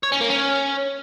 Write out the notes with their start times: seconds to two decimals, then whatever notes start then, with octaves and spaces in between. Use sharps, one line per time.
0.03 C#5
0.12 C#4
0.21 A#3
0.29 C#4